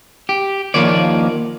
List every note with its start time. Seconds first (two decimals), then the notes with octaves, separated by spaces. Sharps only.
0.29 G4
0.74 D#2 F3 A#3 C#5 D5